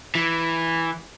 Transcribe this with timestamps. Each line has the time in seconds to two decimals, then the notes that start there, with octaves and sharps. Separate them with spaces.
0.15 E3